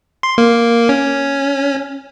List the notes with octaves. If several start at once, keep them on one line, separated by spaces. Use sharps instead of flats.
C6
A#3
C#4